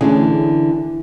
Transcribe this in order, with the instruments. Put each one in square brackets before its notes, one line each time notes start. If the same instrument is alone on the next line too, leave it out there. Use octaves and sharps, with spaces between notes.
[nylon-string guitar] D3 E3 [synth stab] A3 C#4 G#4